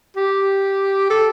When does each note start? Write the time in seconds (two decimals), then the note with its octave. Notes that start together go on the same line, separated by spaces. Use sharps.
0.16 G4
1.10 A4